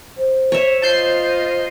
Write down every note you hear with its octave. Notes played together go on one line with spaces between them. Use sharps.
C5
C#5 E5
F4 D#5 A5 G6 C7